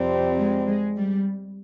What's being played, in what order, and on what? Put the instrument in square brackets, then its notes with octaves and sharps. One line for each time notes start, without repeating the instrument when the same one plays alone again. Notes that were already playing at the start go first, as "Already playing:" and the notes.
Already playing: [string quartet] F2 C3 G3 C4
[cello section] G#3
G#3
G3